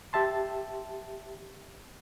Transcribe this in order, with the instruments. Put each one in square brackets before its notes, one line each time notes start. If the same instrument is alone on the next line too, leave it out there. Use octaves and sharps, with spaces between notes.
[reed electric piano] G4 E5 A5 C6